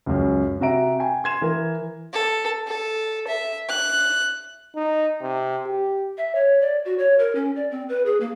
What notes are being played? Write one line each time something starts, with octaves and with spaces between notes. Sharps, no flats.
C#2 F#2
C3 F#4 E5 A#5 D7
G5 G#5
C6 G#6 E7
E3 A#4
A4
A4
E5
F#6
D#4
C3
G4
E5
C#5
D5
F#4
C#5
A#4
C#4
D5
C4
B4
G#4
A#3